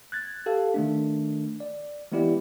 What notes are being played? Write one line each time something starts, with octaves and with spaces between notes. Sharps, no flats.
F#6 G#6 A6
G4 A4 F5
D#3 A3 D4
D5
E3 G#3 B3 E4 G4 D5